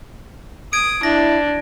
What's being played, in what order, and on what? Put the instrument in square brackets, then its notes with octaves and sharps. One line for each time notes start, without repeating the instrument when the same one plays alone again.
[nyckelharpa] D#6 [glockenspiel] G#6 D7
[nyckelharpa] D4 [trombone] E4 [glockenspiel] A#6